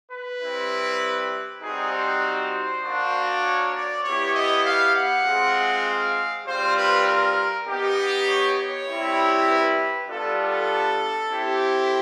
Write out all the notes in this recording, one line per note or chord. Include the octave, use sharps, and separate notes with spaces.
B4
G3 C4 E4
G3 C4 D#4 F#4 G#4
C5
A#3 D4 F#4
C#5
D5
B3 E4 G4 C#5
D#5
F5
F#5
G#3 C4 F4
F5
G3 C4 F4 C5
B4
A#4
B3 D#4 G4
C#5
C#5
G3 C4 E4 G4
B4
G3 B3 D4 F4 A4
A4
C4 E4 G4